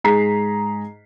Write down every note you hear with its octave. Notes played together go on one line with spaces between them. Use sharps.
G#2 G#4 A#5 B6 C7